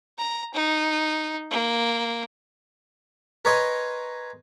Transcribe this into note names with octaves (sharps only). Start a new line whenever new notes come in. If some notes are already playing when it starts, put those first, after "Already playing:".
A#5
D#4
A#3
A#4 B4 C#5 D#5 G#5 C6